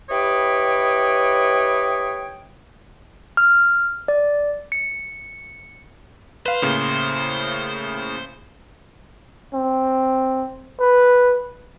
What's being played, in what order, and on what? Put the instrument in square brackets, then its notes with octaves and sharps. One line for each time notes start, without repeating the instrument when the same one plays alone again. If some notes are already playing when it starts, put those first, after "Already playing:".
[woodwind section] E4 G4 B4 C#5 D#5 G5
[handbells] F6
D5
C#7
[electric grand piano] B4 F5 [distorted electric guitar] C5
[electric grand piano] A2 C#3 A#3
[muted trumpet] C4
B4